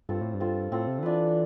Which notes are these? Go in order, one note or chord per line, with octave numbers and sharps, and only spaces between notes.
G2 C4 F4 A4
A2
G2
C4 F4 A4
A2 C4 F4 A4
C3
D3
E3 D4 F4 B4